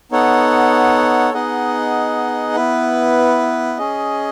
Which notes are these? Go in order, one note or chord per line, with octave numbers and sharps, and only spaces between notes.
B3 D#4 A4 C#5 F#5
B3 D#4 G#4 D#5 F#5
B3 E4 B4
C#4 G#4 D#5